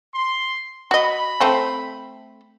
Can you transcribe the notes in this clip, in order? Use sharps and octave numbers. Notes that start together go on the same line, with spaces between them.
C6
F#4 D#5 B5
A3 C4 A4